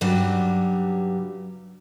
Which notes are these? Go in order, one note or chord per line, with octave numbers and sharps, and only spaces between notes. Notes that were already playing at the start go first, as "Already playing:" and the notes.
G2 C#3 F#3 G3